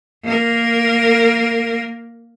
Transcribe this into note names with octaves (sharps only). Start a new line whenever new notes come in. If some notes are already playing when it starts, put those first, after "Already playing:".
A#3 A#4